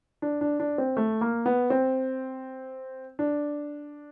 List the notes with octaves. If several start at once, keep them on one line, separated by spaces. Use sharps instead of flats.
D4
D4
D4
C4
A3
A#3
B3
C4
D4